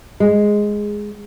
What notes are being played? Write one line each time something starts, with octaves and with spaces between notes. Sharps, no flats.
G#3